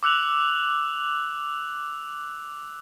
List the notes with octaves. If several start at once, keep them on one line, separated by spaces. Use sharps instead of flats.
D6 E6 F#6 F7 F#7